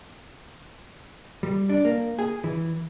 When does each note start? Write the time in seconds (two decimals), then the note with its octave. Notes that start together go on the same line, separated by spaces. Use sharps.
1.43 G3
1.70 D4
1.85 A#3
2.19 G#4
2.44 E3